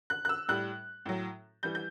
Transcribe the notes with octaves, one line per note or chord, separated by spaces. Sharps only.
F#6
F#6
E6
A2 G3 F#6
A2 F#3
E3 G3 G6
G6